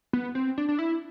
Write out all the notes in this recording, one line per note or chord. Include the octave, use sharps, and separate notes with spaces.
B3
C4
D4
D4
E4